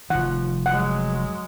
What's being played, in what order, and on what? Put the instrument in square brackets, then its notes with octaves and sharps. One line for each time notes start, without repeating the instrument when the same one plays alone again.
[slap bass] F1 D#3 [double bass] F3 [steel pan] F#5
[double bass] F#3 G#3 [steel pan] F#5